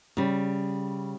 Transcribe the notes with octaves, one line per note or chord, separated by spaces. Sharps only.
C#3 G3